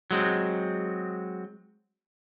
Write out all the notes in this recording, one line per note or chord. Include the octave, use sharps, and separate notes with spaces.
F#3 G#3 C4